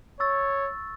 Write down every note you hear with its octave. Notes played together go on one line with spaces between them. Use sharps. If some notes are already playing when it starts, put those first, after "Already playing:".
C#5 C#6 E6 A6